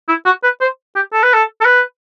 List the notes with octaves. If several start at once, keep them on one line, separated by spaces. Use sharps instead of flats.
E4
F#4
B4
C5
G4
A4
B4
A4
A4
B4